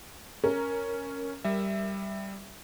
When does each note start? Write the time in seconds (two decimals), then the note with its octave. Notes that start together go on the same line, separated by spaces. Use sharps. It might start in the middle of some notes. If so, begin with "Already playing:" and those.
0.44 C#4 A#4
1.44 G3 E5